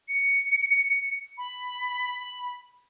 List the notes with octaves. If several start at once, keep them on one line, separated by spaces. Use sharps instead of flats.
C#7
B5